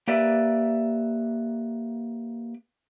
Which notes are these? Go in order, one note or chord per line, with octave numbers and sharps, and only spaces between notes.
A#3 G4 B4 D5 E5